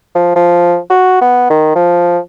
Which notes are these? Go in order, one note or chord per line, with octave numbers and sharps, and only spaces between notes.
F3
F3
F#4
B3
D#3
F3